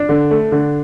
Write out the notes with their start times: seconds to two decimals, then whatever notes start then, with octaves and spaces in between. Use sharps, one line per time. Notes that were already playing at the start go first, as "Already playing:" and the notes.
Already playing: D4
0.09 D3
0.31 A3
0.52 D3